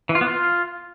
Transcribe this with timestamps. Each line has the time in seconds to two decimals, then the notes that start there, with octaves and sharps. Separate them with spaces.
0.09 E3
0.15 F4
0.21 B3
0.27 F4